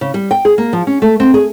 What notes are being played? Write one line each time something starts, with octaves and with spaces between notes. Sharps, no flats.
C#3
G3
G5
G#4
A#3
F3
C#4
A3
C4
G#4